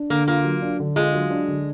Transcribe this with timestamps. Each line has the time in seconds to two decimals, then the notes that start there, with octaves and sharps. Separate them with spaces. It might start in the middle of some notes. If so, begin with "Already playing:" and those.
Already playing: D4
0.10 D3 A#3
0.28 A#3 F4
0.44 F#3
0.62 D4
0.80 D3
0.96 G#3 F4
1.14 F#3
1.30 D4
1.48 D3